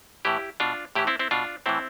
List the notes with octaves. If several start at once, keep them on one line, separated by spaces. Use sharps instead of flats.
A2 E3 E4 G4
B2 D4 F4
A2 E3 E4 G4
C4 E4
C4 E4
B2 D4 F4
A2 E3 C4 E4